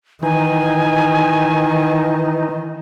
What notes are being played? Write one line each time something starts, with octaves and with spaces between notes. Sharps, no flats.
D#3 E3 D#4 G#5